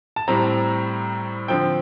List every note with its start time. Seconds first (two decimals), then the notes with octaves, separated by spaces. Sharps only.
0.16 A5
0.28 A2 G3 C4 A#5
1.48 D3 F3 C4 G5